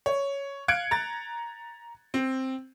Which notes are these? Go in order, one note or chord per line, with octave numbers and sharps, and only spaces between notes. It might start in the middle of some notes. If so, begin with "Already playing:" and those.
C#5
F5 F#6 G#6 C#7 D7
A#5 A6
C4